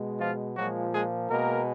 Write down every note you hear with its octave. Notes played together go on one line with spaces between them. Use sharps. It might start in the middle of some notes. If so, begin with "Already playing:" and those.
Already playing: B2 G#3
F3 F4
A#2 F3 F#3 G#3 F#4
G#3 G#4
B2 G#3 A#3 A#4